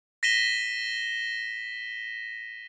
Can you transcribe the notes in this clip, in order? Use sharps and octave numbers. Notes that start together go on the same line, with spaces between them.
A#6 B6 D#7 E7 G7